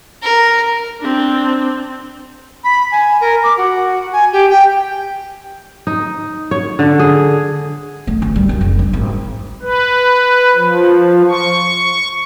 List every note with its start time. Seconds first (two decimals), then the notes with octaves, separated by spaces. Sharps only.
0.23 A#4
1.00 C4 D4
2.64 B5
2.92 G#5
3.21 A#4
3.44 D6
3.57 F#4
4.12 G#5
4.33 G4
4.50 G5
5.87 D#4
6.51 C#5
6.79 D3
6.99 G#4
8.07 A3
8.22 D2
8.36 G3
8.49 F#2
8.61 F#1
8.79 D4
8.93 G#1
9.62 B4
10.55 F3
11.29 C#6